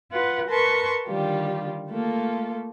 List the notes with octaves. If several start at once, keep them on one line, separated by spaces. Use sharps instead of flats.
F4 B4 F#5
A#4 B4 A5 C6 C#6
D3 D#3 G3 F4 G4
A3 A#3 F4 A4